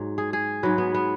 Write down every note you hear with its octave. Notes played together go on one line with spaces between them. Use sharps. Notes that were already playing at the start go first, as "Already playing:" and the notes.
Already playing: G#2 F#3
G#4
G#4
G#2 F#3 B4
B3
B3